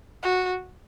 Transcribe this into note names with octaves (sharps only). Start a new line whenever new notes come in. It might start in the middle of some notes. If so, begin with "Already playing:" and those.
F#4